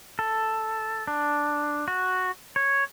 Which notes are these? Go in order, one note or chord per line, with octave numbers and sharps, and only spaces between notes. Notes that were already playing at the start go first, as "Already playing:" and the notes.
A4
D4
F#4
C#5